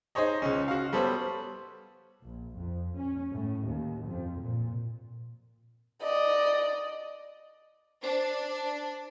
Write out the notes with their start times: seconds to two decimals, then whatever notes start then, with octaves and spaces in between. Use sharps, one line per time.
0.15 D#4 G#4 C5 C#5 D#5
0.42 C#2 C#4
0.68 F#4 F5
0.93 G3 B3 A4 C5 C#5
2.23 A#1
2.57 F2
2.97 C#4
3.33 A2
3.66 D#2
4.07 F2
4.43 A#2
6.02 D5 D#5
8.04 D4 C5